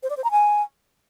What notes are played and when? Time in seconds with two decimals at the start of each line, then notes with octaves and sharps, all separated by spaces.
0.03 C5
0.10 D5
0.17 C5
0.24 A#5
0.31 G#5